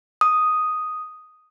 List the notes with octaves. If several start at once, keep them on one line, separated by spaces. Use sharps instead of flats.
D#6